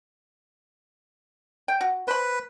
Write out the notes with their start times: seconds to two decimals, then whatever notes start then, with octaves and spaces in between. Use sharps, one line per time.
1.68 G5
1.81 F#4
2.08 B4 C5 B5